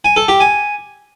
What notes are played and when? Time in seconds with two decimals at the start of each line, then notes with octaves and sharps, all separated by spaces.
0.05 G#5
0.16 A4
0.28 G4
0.40 G#5